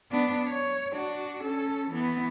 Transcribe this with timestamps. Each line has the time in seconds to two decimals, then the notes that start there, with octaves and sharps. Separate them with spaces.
0.12 B3 D4
0.48 C#5
0.92 D4 F#4
1.43 C#4 A4
1.90 E3 B3